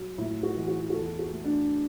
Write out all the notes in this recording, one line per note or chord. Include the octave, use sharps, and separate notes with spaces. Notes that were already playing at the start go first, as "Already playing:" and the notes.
Already playing: F#3
A2 E4
F#4
E3
F#4
F#4
E2 A4
F#4
A3
D4